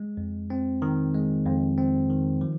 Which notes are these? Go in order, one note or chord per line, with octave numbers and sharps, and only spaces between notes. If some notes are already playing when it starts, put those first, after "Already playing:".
Already playing: G#3
F2
C4
D#3
G#3
F2
C4
D#3
F3